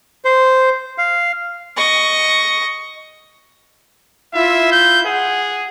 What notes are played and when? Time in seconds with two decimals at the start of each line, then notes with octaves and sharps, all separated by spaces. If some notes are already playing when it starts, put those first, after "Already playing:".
0.25 C5
0.98 F5
1.77 D#5 C#6
4.34 E4 F4 E5
4.72 G6
5.07 G#4 F#5